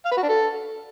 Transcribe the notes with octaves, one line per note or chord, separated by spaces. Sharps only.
F5
B4
F#4
D4
A4